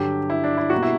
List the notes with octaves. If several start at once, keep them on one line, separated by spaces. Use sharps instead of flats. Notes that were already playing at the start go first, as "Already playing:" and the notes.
Already playing: G2 D3 F#3 G4
E4
D4
E4
B2 G3 A#3 F#4
E4